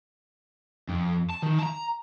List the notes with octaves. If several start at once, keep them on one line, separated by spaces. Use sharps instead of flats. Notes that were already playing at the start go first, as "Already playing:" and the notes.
F2
A5
D#3
A5 A#5